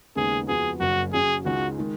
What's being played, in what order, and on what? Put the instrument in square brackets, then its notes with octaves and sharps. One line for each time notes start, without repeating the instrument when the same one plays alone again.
[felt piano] D#2 C#3 G#3 B3 D#4 [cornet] G#4
[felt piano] F2 F3 B3 F#4 [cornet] G#4
[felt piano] F#1 F#2 C#3 [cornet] F#4
[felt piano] C#3 F#3 C#4 [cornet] G#4
[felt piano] C#2 C#3 G#3 D#4 [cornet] F#4
[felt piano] D#3 G#3